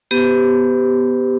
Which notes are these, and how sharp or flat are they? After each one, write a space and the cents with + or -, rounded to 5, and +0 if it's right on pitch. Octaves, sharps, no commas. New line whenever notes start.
B3 +0 G4 +0 B4 +45